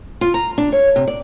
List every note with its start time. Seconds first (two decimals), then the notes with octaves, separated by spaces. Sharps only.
0.21 F4
0.34 A#5
0.58 D4
0.72 C#5
0.96 C3
1.08 D5